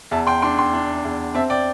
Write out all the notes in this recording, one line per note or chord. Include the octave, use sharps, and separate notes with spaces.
E2 E5 A5
G5 C6
D4 G5 C6
G5 C6
D4
E2
C4 E5 A5
D5 G5